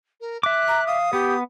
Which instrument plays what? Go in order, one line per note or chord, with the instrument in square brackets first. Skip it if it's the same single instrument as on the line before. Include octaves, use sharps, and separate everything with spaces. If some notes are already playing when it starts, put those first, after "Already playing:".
[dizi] A#4
[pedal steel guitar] E5 D6 [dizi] F#6
[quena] A#5
[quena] F5 [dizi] D#6
[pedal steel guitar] B3 [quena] G4